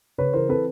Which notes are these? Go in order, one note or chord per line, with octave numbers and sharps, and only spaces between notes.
C#3 B4 C#5
E3 A#4 C5
C4 A4 B4